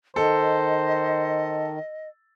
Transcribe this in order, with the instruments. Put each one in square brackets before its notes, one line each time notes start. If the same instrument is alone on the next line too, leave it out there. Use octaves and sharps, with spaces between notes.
[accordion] D#3 [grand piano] A4 [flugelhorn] C5 [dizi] D#5